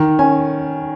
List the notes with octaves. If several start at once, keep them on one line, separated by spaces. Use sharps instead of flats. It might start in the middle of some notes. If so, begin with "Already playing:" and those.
Already playing: D#3
C#4 G#5